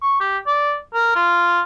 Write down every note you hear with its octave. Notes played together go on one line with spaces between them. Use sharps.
C#6
G4
D5
A#4
F4